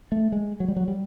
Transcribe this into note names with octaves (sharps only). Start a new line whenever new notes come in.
A3
G#3
F#3
G3
F#3
G3